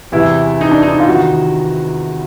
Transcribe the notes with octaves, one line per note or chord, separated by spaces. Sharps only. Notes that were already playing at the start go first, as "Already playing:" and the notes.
E2 C3 E3 E4
D#4
D4
D#4
F4
E2 C3 D#3 F#4